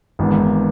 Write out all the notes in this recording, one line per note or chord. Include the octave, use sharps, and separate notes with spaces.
G#1 G#2 E3 B3 D4